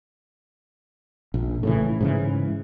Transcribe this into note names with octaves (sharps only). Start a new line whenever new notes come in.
A#1
A2 C#3 E3
G#2 C#3 E3